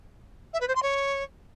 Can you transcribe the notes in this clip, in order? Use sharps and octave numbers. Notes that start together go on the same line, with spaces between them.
E5
B4
C5
C6
C#5